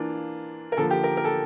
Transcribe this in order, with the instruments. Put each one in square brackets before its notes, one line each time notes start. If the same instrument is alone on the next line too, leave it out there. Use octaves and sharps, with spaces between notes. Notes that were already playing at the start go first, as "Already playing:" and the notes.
Already playing: [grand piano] E3 A#3 D4 [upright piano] F4
[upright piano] A#4
[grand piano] D3 F3 A#3 [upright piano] A4
[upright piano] G4
A#4
A#4
A4